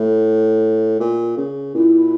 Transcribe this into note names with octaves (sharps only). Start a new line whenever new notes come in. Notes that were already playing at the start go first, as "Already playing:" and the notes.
Already playing: A2
A#2
C#3
A#2 E4